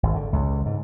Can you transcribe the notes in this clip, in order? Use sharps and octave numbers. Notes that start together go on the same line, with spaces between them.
G#1
D3
C#2
G#2